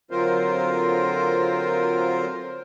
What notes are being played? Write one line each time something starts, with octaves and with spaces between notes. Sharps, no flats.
D3 F#3 C4 F4 A#4 C5